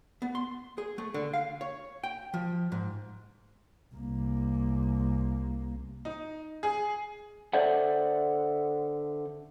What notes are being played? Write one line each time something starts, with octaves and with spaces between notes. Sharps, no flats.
B3
C6
G#4
A3
D3
F5
C#5
G5
F3
G#2
C2 A#3
D#4
G#4
D3 A4 C5 D5 E5 F#5